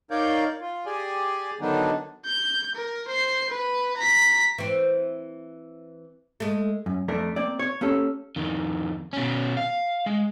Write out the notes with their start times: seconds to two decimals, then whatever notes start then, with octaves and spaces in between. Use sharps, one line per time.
0.11 D#4 A#4 C#5 D5 F5 G6
0.61 F4
0.86 G4 G#4 D5 G#5
1.61 D3 D#3 F#3 B3 D4 D#4
2.25 G6
2.75 A#4
3.08 C5 C7
3.50 B4
3.97 A#5 B6
4.58 E3 C4
6.40 G#3 A3
6.86 F#2
7.08 F2 A3 D4 A#4
7.36 A#3 C4 D5
7.59 C#5
7.81 A#3 C#4 G4 A4
8.36 F2 D#3
9.13 B2 C#4
9.57 F5
10.06 G#3